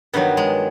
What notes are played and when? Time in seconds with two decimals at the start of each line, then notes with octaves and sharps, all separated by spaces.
0.13 G2 D#3 F#3 B3
0.37 G#3